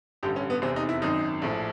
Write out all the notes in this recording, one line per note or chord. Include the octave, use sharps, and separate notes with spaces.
A1 G2 D3 G4
C#4
B3
F1 E2 C3 C4
D#4
E4
G#1 F#2 D#3 D#4
A#1 A2 F3